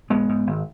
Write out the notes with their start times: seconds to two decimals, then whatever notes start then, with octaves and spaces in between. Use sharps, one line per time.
0.10 A#1 G#3 B3
0.29 G#2
0.47 G#1